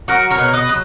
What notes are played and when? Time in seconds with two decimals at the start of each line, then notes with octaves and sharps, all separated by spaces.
0.08 F#3 F#4 A#4
0.30 A#4 C#5
0.38 B2
0.53 B4 D#5
0.69 F#3